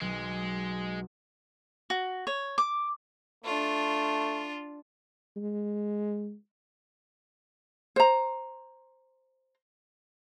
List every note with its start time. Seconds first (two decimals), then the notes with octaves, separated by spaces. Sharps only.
0.01 B1 G#3
1.90 F#4
2.27 C#5
2.58 D6
3.44 A3 D4 F4
5.36 G#3
7.96 C5 A#5